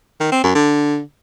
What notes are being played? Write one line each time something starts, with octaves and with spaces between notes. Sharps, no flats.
D#3
C4
F#2
D3